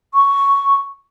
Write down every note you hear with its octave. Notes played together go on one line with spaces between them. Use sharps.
C#6